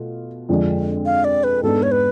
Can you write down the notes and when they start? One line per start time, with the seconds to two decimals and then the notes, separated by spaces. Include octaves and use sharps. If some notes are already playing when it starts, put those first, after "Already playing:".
Already playing: B2 A3 F4
0.49 F2 D3 F3 G#3 D4
1.06 F5
1.24 D5
1.44 B4
1.63 G#2 G#3 B3 D4 A4
1.83 C#5
1.92 B4